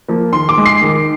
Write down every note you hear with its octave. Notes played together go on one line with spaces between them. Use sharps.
F3 A#3
D#3 C6
D6
G#3
C7
D#3